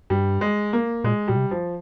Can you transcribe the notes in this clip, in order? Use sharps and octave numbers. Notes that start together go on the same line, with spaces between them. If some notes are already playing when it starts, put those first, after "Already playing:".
G2 G3
G#3
A#3
A#2 G#3
A#2 G3
C3
F3